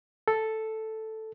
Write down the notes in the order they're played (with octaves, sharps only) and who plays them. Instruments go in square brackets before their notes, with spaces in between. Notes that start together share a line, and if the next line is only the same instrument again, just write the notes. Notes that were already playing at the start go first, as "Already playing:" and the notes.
[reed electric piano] A4